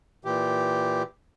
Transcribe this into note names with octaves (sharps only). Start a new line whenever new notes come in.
A#2 E3 G4